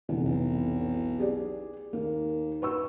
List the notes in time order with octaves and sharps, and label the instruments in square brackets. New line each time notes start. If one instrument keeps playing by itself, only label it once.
[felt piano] F1 E3 [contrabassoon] E2
[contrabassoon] B1
[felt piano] G4 G#4 D5
[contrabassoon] D#2 [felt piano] A#3
[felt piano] B4 C#6 E6